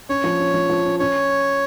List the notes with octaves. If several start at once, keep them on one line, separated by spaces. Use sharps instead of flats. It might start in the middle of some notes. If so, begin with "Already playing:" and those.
C#4 C#5
F3
C#4
F3
F3
C#4
C#4 C#5